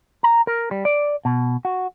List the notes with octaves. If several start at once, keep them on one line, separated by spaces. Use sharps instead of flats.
A#5
A#4
G3
D5
B2
F#4